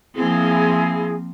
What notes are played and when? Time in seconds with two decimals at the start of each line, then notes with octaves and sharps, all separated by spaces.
0.15 F3 A#3 C4 E4 G#4